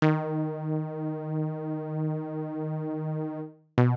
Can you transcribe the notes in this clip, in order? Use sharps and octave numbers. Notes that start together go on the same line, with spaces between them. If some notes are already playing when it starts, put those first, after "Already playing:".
D#3
B2